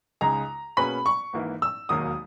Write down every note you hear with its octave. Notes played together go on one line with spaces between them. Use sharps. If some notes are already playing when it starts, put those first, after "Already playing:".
C#2 C#3 G#3 D#4 G#4 A#5
B2 A#3 C#4 G#4 B4 B5
C#6
G#1 G#2 E3 A#3 E4
E6
E1 D#2 D#3 F#3 A#3 D#6